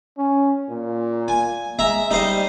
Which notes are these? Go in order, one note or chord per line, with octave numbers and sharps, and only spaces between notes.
C#4
A#2
G#5
G#3 E5 A#5
G3 D#4 C5 D#5